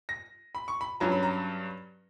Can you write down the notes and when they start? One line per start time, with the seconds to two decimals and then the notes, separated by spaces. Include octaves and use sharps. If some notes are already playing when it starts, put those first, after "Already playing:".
0.09 A#6
0.55 B5
0.68 C#6
0.81 B5
1.00 G2 F#3 C#4 A#5
1.12 B5
1.23 A#5